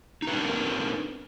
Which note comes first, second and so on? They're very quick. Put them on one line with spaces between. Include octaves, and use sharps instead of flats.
D#4 B4 D4 C4 A#4